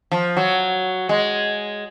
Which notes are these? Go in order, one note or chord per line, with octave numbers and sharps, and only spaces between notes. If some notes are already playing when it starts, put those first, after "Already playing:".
F3
F#3
G#3